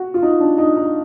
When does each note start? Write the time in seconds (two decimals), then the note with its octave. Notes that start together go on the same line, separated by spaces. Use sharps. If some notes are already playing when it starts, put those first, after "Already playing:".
Already playing: F#4
0.14 F4
0.22 D#4
0.40 D4
0.58 D#4
0.77 D#4